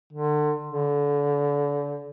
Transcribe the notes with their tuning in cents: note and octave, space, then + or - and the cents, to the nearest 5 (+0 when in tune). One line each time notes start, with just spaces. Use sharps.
D3 +30
D3 -30